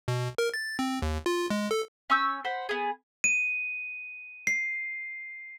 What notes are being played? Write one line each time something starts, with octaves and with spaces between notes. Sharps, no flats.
B2
A#4
A6
C4
D#2
F4
G#3
A4
C#4 C#6 E6 G6
C5 F#5 B5
B3 G#4
D#7
C7